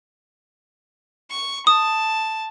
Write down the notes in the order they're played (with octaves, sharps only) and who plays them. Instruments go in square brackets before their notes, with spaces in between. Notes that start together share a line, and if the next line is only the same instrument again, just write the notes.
[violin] C#6
[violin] A5 [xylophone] D#6